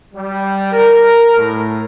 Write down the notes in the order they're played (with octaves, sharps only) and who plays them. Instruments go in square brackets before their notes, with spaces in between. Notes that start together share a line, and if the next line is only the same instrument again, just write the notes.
[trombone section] G3
A#4
A2